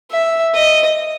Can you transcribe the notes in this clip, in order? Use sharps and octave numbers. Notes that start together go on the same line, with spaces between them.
E5
D#5